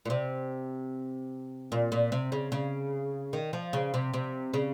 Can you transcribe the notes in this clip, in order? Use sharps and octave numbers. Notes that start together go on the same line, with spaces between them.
A#2
C3
A#2
A#2
C3
C#3
C#3
D#3
F3
C#3
C3
C3
C#3